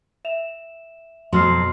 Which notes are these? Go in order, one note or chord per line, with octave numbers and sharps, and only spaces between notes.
E5 E7 F7
F2 B2 F#3 C6 F6 C7